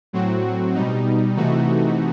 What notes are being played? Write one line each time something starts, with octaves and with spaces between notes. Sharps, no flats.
A2 F#3 C4 F#4
B2 G3 D#4
C3 E3 A3 D#4 F#4